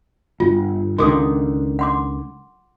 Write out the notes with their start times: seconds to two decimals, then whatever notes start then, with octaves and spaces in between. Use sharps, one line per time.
0.40 G1 F4
0.98 C#2 D3 D#3 C6 D6 D#6
1.79 F#5 C6 D6